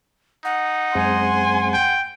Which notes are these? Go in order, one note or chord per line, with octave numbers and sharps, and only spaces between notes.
D#4 F#5
F#2 G#3 C4 G#5 C6
G5